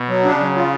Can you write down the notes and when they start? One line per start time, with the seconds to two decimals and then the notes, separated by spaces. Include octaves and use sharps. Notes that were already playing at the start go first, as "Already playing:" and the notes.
Already playing: B2
0.08 F#3
0.25 C#3 D4
0.40 F#3
0.56 F4